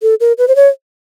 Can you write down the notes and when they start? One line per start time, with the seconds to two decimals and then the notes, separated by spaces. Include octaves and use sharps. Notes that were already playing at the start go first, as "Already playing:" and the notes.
0.02 A4
0.20 A#4
0.38 B4
0.48 C5
0.56 C#5